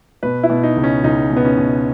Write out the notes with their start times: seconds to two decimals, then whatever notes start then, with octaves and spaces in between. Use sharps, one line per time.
0.23 B2 B4
0.43 E4
0.50 B2
0.63 D#4
0.77 C#2
0.84 C#4
1.04 C#2 D#4
1.31 B2
1.37 B3
1.45 C#4
1.58 B2